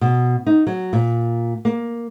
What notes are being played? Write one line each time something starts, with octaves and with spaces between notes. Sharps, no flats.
B2
D#4
F#3
A#2
A#3